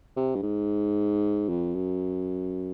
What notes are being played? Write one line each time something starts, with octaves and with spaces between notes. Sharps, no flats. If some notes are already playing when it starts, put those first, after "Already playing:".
C3
G2
G#2
F2
F#2